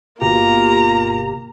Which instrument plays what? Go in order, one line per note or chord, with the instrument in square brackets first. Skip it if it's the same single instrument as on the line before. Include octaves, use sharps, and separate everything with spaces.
[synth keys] G1 B2 G4 [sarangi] A#3 [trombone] F4 [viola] A#5